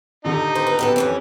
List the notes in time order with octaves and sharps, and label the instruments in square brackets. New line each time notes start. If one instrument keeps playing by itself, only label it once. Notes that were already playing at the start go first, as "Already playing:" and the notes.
[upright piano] D#1 D3 [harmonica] D#4 [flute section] G4
[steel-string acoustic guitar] C5
B4
[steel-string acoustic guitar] F#2 B3 A4 [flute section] G4 B4 G5
[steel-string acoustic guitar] F2 E3 C#4